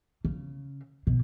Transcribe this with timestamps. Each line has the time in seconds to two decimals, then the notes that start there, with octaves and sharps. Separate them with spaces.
0.25 C#3
1.07 B2